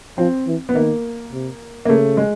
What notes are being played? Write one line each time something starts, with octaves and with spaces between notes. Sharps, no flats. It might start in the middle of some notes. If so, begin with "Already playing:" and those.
F3 C4
E3
B3
D#3 A#3
C3
A#3
C#3 A3
G#3